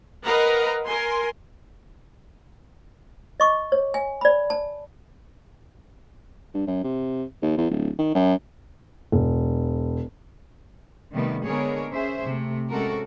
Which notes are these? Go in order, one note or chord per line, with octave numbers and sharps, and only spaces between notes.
A#4 B4 D#5 F5 F#5 A#5
A#4 G#5 C6
D#5 C#6 D6
C#5
G#5
D5 B5
A5
G2
F#2
C3
D#2
E2
D1
D#3
F#2
E1
C3 D#3 G3 A3 B3
D3 G#3 B3 G#4 A#4 C#5
C#4 G#4 C5 E5
C3 A3
C3 G#3 C#4 F#4 A4 A#4